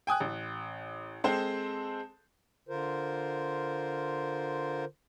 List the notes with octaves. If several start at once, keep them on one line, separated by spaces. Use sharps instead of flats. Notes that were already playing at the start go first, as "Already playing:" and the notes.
G5 G#5 D#6 F#6
A1
G#3 C4 A4 C5
D3 F4 A#4 C5